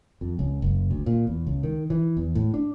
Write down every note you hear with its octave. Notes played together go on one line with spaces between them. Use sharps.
F2
C#2
F#1
D2
A#2
E2
C#2
D#3
E3
E2
A2
D4